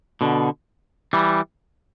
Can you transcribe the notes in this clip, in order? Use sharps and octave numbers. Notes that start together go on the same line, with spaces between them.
B2 D3
E3 G3